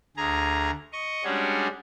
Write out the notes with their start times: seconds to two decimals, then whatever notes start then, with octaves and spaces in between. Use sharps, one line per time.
0.17 D2 G#4 A#5
0.93 D#5 C#6
1.24 G3 G#3 C#4 D4 F#4 G#4